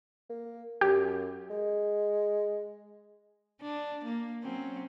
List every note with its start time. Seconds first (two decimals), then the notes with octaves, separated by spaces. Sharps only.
0.30 A#3
0.81 F#2 G4
1.50 G#3
3.61 D4
4.05 A#3
4.43 F#3 C4 C#4